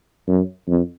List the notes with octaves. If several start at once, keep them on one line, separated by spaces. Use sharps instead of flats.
F#2
F2